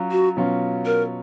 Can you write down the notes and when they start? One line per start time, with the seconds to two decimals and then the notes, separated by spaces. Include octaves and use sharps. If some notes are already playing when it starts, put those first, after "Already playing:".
Already playing: F#3 C#4 F4
0.11 F#4
0.37 B2 F#3 C#4 F4
0.86 A#4